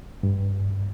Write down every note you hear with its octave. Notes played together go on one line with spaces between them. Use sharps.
G2